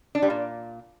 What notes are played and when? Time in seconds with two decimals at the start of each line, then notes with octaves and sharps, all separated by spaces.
0.15 D4
0.22 G3
0.30 A#2